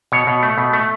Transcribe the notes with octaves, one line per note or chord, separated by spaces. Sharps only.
B2 C#5
B2
A3
B2
A3